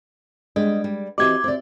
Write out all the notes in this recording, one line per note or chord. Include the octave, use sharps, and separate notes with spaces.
G3 G#3 B3 D4 D#5
G3
E3 C4 F#4 G4 D#5 E5 D6 G#6
C4 D5